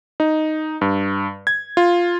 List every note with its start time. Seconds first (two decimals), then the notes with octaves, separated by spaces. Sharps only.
0.20 D#4
0.81 G2
1.47 G#6
1.77 F4